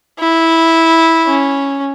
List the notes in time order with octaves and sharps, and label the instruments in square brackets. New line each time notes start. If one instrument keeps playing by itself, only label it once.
[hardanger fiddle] E4
C#4